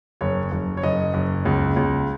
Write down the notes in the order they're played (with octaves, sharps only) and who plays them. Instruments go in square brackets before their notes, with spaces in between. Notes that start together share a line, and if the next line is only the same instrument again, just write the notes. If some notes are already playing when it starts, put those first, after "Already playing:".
[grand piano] F#1 C#5
F#1
C#5
F#1 D#5
F#1
C#2
C#2